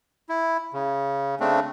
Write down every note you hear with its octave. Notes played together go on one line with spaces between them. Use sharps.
E4
C#3
C#3 A3 C4 D4